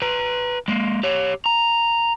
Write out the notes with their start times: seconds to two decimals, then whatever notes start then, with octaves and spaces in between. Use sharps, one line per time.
0.02 B4 A#5
0.68 G#3 A#3
1.03 G4 C#5
1.46 A#5